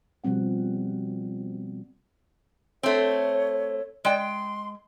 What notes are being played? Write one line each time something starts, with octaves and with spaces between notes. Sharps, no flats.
B2 F3 G3 C4 F#5
A3 C4 C#5
G#3 D5 G5
C6